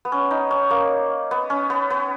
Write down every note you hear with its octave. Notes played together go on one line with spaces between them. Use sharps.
B3
C#4
D#4
C#4
A#3
B3
C#4
B3
B3